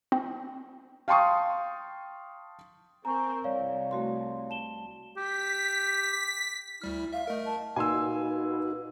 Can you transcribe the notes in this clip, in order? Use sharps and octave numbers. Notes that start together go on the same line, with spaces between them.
C4
F5 G5 A5 C6 C#6 D#6
C4 A#4 G#5 A#5 C#6
C2 C#5 D5 F5
A3 F#4 C6
A5 E7 G7
G4 B6
D2 G3 E4 F6
E5 F5
A3 A#4 D#5
A5
A#2 D#4 F#4 B4 G#5 C6 E6